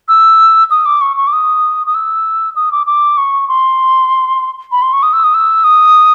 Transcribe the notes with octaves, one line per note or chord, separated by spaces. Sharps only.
E6
D#6
D6
C#6
C#6
D6
D#6
D#6
E6
D#6
D6
D6
C#6
C6
B5
C6
C#6
D#6
E6
D#6
E6
D#6